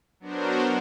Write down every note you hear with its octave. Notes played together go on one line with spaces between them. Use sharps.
F#3 B3 D4 F#4 A#4 C5